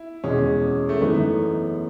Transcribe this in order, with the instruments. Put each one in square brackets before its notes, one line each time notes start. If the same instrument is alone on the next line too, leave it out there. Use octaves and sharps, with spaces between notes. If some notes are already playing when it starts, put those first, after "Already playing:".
Already playing: [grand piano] E4
[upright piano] E2 B2 G#3 [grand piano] C#4
[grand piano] A3
[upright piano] F#2 E3 A3 D#4 [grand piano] B3